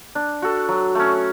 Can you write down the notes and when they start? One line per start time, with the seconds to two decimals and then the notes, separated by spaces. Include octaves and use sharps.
0.15 D4
0.42 F#4 A4
0.69 F#3
0.95 A3 C#4